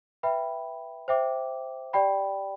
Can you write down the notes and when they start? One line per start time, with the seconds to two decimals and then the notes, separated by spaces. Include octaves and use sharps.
0.23 B4 E5 G5 B5
1.08 C5 E5 G5 D6
1.93 G4 D5 G5 B5